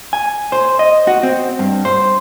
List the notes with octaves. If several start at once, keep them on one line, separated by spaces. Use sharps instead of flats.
G#5
C5
D#5
F#4
C4
G2
C5